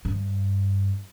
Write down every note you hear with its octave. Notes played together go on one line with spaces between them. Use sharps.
G2